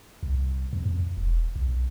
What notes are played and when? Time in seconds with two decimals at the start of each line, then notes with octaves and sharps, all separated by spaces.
0.23 C2
0.73 F2
0.85 F2
1.17 E1
1.56 B1